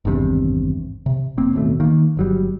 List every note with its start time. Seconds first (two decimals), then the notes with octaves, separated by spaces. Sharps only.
0.05 G#1 E2 G2 C3
1.06 C3
1.37 E1 A#3 C4
1.53 A1 D#2 B2 A3
1.80 D#3 A#3
2.17 G1 F#3 G3